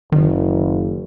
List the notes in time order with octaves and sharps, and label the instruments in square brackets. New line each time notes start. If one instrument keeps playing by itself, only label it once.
[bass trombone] F#1 [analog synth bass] D#3